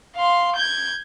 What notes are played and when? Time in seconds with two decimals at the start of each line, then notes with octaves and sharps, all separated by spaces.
0.16 F5 C6
0.56 G6 G#6